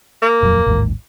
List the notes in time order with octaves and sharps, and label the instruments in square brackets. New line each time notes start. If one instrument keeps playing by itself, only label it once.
[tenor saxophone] A#3
[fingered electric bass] D#1 F2 F#3
A1 D#2 G#2